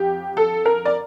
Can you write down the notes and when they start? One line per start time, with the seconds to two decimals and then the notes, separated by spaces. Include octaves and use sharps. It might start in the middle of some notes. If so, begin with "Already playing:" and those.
Already playing: F2 G4
0.37 A4
0.65 A#4
0.85 D5